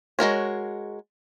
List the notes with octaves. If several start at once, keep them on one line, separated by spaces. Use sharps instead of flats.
G#3 F#4 A#4 C#5